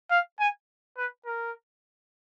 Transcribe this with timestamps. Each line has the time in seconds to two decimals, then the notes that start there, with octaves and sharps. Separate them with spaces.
0.11 F5
0.40 G#5
0.97 B4
1.26 A#4